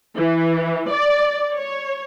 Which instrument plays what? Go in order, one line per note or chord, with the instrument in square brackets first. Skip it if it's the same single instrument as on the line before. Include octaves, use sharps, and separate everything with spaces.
[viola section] E3
D5
C#5